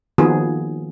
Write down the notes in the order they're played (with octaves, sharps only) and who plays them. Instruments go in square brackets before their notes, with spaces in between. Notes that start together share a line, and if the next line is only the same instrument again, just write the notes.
[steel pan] D#3 F3 A#3 B3 F#4 G#4